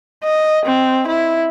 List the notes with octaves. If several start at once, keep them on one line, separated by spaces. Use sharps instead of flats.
D#5
C4
E4